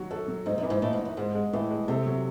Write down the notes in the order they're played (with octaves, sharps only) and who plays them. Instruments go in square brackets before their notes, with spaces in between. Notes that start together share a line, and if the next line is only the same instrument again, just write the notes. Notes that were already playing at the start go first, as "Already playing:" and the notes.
Already playing: [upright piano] D#3 F#3 F#4
[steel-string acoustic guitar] F#2 [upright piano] A4
[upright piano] F#3
[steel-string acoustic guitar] G#2 [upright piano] D#4
[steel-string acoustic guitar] F#2
[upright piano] E3
[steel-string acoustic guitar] G#2
[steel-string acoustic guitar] A2 [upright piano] D#4
[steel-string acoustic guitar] G#2
[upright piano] D#4
[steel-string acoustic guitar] F#2
[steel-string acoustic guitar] G#2 [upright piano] G#3
[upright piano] G#3
[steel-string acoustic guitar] A2 [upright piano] E3
[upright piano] G#3
[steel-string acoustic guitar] C3 [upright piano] A4
[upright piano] F#3